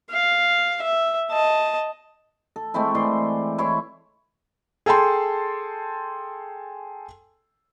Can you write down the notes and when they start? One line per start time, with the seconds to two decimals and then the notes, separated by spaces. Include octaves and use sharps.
0.10 F5
0.81 E5
1.31 D#5 A5
2.56 A4
2.74 G#3 A3 C4 E4
2.95 E3 D5 C6
3.58 E4 C#5 C6
4.86 G#4 A4 G5 A5 C6